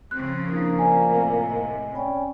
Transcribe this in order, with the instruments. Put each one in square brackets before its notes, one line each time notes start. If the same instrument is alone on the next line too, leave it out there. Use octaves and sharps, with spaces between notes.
[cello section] C#3 F3 C4 [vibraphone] C6 [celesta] F#6
[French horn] A#3 [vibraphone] D4 E4 D#6
[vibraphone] F4 C5 D5 [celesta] G#5
[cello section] A2 C3
[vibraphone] D#5
[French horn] C#4 [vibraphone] D5 G5 B5